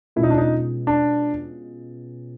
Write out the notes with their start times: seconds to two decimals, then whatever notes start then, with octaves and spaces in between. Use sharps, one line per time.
0.16 B2 G#3 C#4 E4 F4
0.23 D#4
0.30 D4
0.38 D#4
0.87 D4